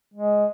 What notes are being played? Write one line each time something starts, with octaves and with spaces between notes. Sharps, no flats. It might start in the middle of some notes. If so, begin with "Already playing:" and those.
G#3